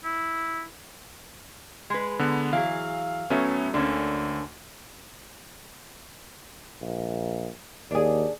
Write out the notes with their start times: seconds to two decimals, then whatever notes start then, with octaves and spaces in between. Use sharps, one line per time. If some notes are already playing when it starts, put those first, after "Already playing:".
0.05 E4
1.90 G#3 B4
2.19 D3 B3
2.53 E3 F#3 G#4 F5
3.30 A2 F#3 A3 B3 C#4
3.74 D2 D3 A#3 C#4
6.82 A#1
7.91 D#2 D4 G#4